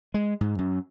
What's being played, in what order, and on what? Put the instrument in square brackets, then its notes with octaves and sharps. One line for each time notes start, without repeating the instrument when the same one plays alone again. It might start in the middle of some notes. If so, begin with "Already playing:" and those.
[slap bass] G#3
G#2
F#2